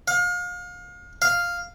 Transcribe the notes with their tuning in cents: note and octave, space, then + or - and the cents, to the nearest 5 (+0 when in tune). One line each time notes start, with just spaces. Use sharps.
F5 +35
F5 +0